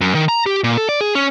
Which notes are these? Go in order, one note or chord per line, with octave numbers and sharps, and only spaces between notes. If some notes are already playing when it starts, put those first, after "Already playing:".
F#2
D#3
A#5
G4
A#2
A4
D5
G#4
C#4